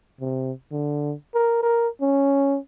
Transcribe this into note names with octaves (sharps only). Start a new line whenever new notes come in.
C3
D3
A#4
A#4
C#4